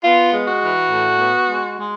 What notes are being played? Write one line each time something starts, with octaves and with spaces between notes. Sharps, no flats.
B3 F4
G#3
F#4
E3
A2
B3
G#3
G#3